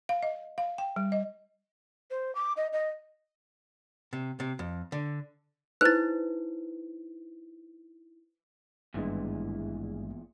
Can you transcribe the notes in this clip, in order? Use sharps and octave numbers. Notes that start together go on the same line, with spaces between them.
F5
D#5
F5
G5
G3
D#5
C5
D6
D#5
D#5
C3
C3
F2
D3
D#4 E4 B4 C5 F#6 A6
G#1 E2 G2 A#2 E3 G#3